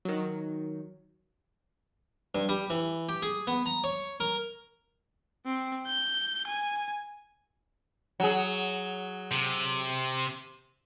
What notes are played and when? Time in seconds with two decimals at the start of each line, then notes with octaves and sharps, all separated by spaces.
0.05 D#3 F#3
2.35 G2
2.49 G3
2.70 E3
3.09 G4
3.22 G#4
3.47 B3
3.66 A#5
3.84 C#5
4.20 A#4
5.46 C4
5.86 G6
6.47 G#5
8.20 F#3 G#4
9.31 C3